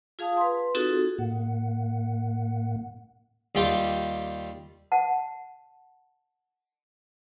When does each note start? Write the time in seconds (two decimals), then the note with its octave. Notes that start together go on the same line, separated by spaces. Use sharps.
0.19 F4 G#4 F5 A5 D#6
0.37 B4 C6
0.75 C4 D#4 F4 F#4 G#4 A4
1.19 A2 A#3 F#5
3.55 D#2 G3 F4 G4
4.92 F#5 A5